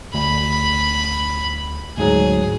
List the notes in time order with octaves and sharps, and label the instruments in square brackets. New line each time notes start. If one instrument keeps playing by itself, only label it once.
[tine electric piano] D2 [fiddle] B5
[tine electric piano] D2 G#2 F#3 [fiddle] G#4